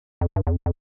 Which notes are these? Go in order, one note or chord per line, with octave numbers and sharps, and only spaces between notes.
F2
G2
E2
F2
F2